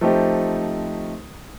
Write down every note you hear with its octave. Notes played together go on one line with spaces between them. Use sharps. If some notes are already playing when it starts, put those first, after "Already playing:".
F3 A3 C4 D#4 G4